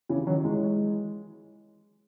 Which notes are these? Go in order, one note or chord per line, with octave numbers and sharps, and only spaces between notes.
C#3 E3
D#3 F#3
E3 G#3